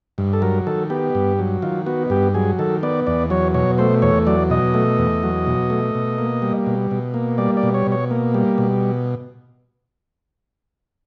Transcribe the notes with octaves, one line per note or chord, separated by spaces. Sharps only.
G2
A4
F#3 A#4
D#3 A4
B3 G4
G2
F#3
D#3 F4
B3 F#4
G2 G4
F#3 G#4
D#3 A4
B3 D5
E2 D5
F#3 C#5
B2 C#5
A3 C5
E2 C#5
F#3 D5
B2 D#5
A3
E2
F#3
B2
A3
B2
A#3
G3
B2
B2
A#3
G3 D5
D5
B2
C#5
B2
C#5
A#3
G3
B2